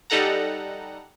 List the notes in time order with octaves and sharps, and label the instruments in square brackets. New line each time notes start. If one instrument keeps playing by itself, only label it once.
[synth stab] G3 D#4 A4 F#5 A#5